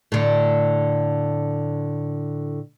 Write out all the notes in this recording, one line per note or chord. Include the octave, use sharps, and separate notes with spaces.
A2 D3